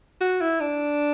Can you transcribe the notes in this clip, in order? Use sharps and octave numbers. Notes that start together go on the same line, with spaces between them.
F#4
E4
D4